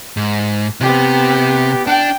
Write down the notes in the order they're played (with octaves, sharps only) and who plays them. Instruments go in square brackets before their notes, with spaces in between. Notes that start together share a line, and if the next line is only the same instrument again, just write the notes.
[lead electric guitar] G#2
[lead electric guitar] C3 [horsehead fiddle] B3 G4
[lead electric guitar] D4 [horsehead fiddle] G5